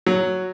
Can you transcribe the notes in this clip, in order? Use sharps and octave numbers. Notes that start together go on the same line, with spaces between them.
F#3